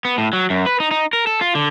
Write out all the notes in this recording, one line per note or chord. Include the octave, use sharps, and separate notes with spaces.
B3
A2
F#3
F#2
B4
D#4
D#4
A#4
A4
F4
D3